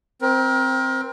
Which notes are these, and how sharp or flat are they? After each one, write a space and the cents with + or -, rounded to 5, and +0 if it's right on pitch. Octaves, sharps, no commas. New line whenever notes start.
C4 +0 A#4 +30